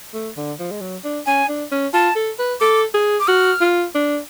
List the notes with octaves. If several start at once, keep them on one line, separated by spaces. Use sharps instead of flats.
A3
D3
F3
G#3
F#3
D4
C#4 G#5
D4
C#4
F4 A5
A4
B4
A4 D6
G#4
D6
F#4 F6
F4
D4